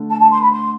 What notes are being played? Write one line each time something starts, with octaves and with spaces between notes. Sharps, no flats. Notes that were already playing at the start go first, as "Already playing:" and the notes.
Already playing: D3 A3
A5
A5
C6
B5
C6